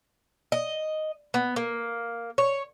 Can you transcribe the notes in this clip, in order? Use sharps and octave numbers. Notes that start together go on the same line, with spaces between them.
D#5
B3
A#3
C#5